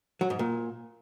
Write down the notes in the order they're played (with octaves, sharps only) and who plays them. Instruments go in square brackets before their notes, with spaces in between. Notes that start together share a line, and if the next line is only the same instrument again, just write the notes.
[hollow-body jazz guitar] F#3
G#2
A#2